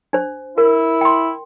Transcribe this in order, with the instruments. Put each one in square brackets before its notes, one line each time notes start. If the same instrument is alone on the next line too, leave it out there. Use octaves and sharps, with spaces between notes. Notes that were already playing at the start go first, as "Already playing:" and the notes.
[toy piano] D4 C5
[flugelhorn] E4 [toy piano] A#4
[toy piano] G5 C6